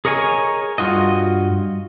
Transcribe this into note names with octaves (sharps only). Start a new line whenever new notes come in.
G#4 A#4 C#5 D#5 G#5
G2 F4 F#4 D#5